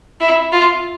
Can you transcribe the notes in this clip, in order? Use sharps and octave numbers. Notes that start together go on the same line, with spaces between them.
E4
F4